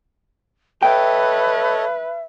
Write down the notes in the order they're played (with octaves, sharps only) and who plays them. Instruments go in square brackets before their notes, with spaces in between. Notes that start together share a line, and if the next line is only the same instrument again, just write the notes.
[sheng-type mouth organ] A4 C#5 D#5 [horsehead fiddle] B4 [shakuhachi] E5 [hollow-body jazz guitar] G5